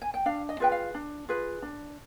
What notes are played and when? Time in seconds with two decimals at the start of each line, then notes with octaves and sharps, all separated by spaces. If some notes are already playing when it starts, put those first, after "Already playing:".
0.02 G#5
0.14 G5
0.26 D4 F5
0.49 D#5
0.60 F4 G#4 B4 G5
0.72 F5
0.95 D4
1.29 F4 G#4 B4
1.62 D4